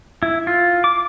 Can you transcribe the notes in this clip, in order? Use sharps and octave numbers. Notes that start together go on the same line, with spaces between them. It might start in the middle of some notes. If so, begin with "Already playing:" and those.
E4
F4
D6